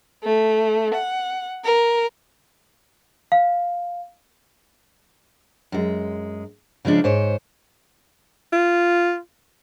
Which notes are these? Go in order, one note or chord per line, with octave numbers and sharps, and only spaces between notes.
A3
F#5
A#4
F5
F#2 G#3
C#3 F3 G#3 D4
G#2 C5 C#5
F4